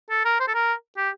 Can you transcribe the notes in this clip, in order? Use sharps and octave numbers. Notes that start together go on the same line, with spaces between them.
A4
A#4
C5
A4
A#4
G4